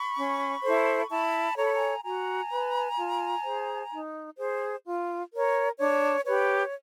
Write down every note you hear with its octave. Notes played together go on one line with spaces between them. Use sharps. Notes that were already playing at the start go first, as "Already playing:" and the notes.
Already playing: B5 C#6
C#4
E4 A4 C5
E4 A5 B5
A4 C#5 A#5
B5
G#5 A#5
F#4 G#5 A#5
B4
F4
G#4 C5
D#4
G#4 C5
F4
A#4 C#5
D4 C#5
G4 B4 C#5